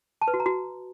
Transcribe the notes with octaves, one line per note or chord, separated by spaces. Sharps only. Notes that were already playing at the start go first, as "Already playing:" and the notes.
A5
B4
F#4
A#5
F#4